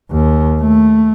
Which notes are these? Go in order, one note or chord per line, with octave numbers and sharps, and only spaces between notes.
D#2
A3